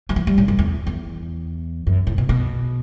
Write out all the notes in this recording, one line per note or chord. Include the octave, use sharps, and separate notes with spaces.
F#3
E3
G3
A2
F#2
E2
E2
F#2
A2
B2
B2